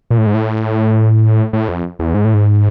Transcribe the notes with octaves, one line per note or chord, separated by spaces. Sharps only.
A#2
A2
G#2
A2
A2
F2
E2
G#2
A2
G#2